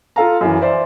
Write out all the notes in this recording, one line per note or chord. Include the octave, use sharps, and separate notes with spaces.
F4 A4 F5 A#5
F#2 E3
C5 D5 E5